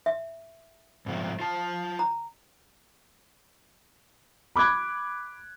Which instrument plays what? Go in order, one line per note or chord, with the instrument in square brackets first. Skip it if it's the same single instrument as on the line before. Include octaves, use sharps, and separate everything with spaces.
[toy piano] E5
[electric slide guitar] G#2 C3 F3
F4 A5
[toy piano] A#5
[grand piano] B5 D6 F#6 G#6